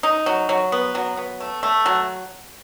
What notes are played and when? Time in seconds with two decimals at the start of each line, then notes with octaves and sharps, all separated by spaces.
0.03 D#4
0.26 F#3
0.49 F#3
0.72 B3
0.95 F#3
1.17 B3
1.40 A3
1.63 A3
1.86 F#3